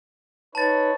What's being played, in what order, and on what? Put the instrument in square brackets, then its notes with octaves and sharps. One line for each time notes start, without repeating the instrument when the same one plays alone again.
[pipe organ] D#4 B4 C#5 [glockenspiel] A5 A6